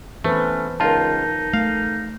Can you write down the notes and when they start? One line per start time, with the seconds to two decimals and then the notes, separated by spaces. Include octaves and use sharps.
0.24 E3 A3 C#4 B4 C5
0.80 C#2 D#4 F4 A#4 A5
1.53 A3 F5